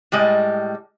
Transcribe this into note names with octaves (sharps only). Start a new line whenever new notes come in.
A2 G3 G#3 D#5